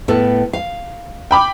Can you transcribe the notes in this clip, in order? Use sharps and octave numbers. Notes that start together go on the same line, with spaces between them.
A2 B3 A4
F5
G5 B5 D6